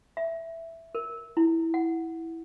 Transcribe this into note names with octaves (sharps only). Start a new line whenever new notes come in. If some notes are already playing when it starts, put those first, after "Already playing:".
E5
A#4
E4
F#5